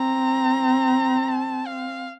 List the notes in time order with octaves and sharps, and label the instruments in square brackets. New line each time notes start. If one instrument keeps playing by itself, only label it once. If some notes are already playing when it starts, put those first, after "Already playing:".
Already playing: [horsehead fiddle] C4 [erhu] A#5
[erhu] A5
F5